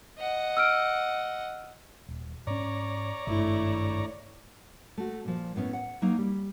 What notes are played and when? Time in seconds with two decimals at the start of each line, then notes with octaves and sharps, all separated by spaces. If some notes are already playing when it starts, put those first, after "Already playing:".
0.18 D#5 F#5
0.57 E6 F6 D7
2.09 D#1
2.47 G#2 C#4 C#5 D5 A#5
3.27 G#1 G2 A3 E4
4.98 A3 F#4
5.25 A#2 F3
5.56 A2 B3 C#4
5.73 F#5
6.02 F#3 A#3 D#4
6.18 G3